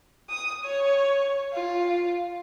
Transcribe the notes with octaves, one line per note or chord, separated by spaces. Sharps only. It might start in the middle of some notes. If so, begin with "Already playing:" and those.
D#6
C#5
F4